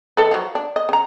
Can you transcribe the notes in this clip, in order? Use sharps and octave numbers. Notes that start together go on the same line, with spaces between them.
D#3 A4 B4
F3 F#3
D4
D#5
C#3 A#5